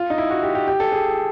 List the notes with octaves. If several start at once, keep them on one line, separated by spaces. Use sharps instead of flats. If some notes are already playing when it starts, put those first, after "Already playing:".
Already playing: F4
D#4
E4
F#4
G4
G4
G4
A4
G#4